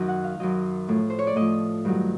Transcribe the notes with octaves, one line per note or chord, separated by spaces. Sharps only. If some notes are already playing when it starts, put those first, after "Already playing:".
Already playing: F#2 D#3 F#3
F#5
F5
F#2 D#3 F#3 D#5
A2 F3
C5
C#5
D5
A2 F3 D#5
G2 D#3 F#3